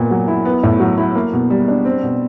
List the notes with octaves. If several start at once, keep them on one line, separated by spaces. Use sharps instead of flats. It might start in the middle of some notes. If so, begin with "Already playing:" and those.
Already playing: A#2 B3
F#3
E4
B3
A2
F#3
E4
A#3
B2
G3
D4
C4
B2